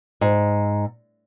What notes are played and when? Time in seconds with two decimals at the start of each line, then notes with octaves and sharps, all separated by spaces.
0.21 G#2